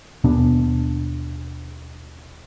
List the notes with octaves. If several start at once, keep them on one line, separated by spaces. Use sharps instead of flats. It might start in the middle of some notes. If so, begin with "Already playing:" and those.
D#2 B2 B3 D4